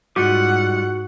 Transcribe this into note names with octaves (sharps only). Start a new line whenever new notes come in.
G#2 G3 F4 F#4 F#5 D6